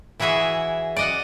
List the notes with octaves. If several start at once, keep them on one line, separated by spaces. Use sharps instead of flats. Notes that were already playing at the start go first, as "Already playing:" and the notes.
E3 E4 F#4 G#4 E5
D5 D#5 F#5